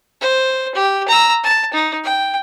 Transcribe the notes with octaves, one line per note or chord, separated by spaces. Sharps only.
C5
G4
A#5 E6
A5
D#4
G5